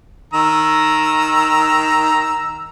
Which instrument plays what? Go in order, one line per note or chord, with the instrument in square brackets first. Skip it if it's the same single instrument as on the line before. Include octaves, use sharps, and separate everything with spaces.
[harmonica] D#3 A#5 E6